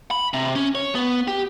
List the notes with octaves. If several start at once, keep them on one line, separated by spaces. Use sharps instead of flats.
B5
C3
C#4
C#5
B3
G4